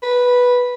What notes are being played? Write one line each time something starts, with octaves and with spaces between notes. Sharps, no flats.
B4